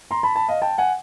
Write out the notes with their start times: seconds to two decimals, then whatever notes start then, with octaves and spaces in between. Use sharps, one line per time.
0.11 A#5 C6
0.23 A5 B5
0.36 A5 B5
0.48 D#5 F5
0.62 G5 A5
0.78 F#5 G#5